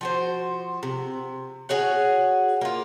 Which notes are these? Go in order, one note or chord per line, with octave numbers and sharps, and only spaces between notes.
F3 F#4 C5
C3
F#4 G#4 C#5 F#5
A#3 F4